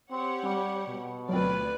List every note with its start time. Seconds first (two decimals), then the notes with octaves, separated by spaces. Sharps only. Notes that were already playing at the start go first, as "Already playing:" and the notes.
0.11 C4 G4 C#5 F#5
0.44 G3 C4
0.87 B2
1.29 D2 F#3 C4 F4 B4 D5